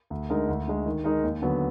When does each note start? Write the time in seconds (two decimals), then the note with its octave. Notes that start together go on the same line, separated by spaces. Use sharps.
0.10 D2
0.30 D3 G#3 D#4 A#4
0.48 D2
0.67 D3 G#3
0.86 D#3
1.04 G#3 D#4 A#4
1.23 D#2
1.42 D3 F#3 B3